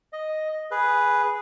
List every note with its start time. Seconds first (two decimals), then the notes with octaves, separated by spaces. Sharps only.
0.13 D#5
0.71 G#4 B4